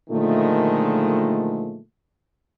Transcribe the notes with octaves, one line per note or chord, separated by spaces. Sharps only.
A#2 D3 D#3 F3 G#3 A3